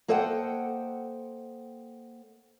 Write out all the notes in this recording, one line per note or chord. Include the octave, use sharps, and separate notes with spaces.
A#3 A4 C5 D#5 F#5 G5